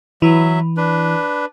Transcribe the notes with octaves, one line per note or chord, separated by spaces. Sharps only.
E3 F#3 E5
D4 B4